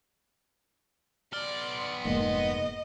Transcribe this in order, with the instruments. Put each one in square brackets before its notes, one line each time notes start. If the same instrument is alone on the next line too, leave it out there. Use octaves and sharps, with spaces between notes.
[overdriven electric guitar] B3 C6 [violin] D5 [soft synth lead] F6
[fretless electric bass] F1 G#2 [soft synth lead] A#3 [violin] D#5